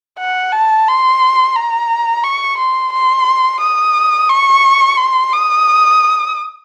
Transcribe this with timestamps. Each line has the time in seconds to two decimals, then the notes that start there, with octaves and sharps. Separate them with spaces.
0.19 F#5
0.53 A5
0.88 C6
1.55 A#5
2.24 C#6
2.58 C6
2.93 C6
3.61 D#6
4.29 C#6
4.97 C6
5.32 D#6